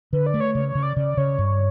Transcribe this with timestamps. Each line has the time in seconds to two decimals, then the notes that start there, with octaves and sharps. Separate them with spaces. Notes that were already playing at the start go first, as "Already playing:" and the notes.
0.12 D3 B4
0.26 D5
0.34 A3
0.40 C#5
0.55 C#3 C#5
0.68 C#5
0.75 C#3
0.83 D5
0.97 C#3 D5
1.17 C#3 C#5
1.39 G2